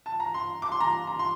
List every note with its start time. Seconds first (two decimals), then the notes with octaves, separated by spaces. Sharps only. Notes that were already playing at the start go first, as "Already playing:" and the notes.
0.06 A5
0.20 A#5
0.34 C6
0.62 D6
0.72 C6
0.80 A#5
1.07 A#5
1.19 C6